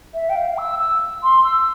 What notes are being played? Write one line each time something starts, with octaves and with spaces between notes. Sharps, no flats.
E5
G5
F5
E6
E6
C6
E6